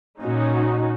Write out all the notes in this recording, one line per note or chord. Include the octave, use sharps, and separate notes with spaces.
A#2 C#4 D#4 F#4